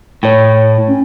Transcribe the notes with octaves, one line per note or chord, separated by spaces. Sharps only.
A2 C#5 G5
C#4